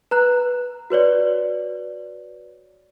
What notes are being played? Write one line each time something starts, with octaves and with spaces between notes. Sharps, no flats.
B4 A#5 F#6
F#4 B4 C#5 D5